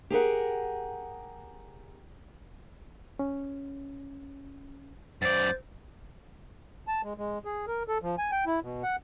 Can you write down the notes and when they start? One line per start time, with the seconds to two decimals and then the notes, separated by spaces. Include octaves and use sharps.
0.10 G4 G#4 A#4 F#5
3.19 C#4
5.22 F#2 C5 D5 A6
6.88 A5
7.03 G#3
7.18 G#3
7.45 G#4
7.67 A#4
7.88 A4
8.02 F3
8.18 G#5
8.32 G5
8.46 E4
8.63 B2
8.83 F#5